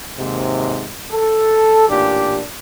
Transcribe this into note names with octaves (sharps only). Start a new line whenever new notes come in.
D#2 G#2 C3
A4
A1 A#2 D4 G4